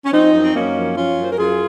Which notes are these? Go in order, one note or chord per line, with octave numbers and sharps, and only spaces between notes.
C#4
F3 C4 D#4
F#2
C4
F#2 A#3 C#4
F3
F3 C#4 F4
F#2
C5
A#4
F#2 F4 G#4